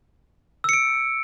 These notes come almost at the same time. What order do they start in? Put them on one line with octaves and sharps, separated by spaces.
E6 C#7 D7